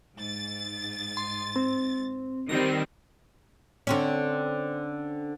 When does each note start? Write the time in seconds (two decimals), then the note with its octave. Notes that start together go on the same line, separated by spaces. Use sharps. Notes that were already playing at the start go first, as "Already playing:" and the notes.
0.15 G#2 A6
1.17 C6
1.56 C4
2.49 D#3 G3 C4 A#6
3.87 D3 C4 C#4